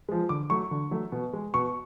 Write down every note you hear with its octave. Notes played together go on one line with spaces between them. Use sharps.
F3 G#3
D3 D6
F#3 A3 C#6
D3
F#3 A3
B2
G#3
B2 C#6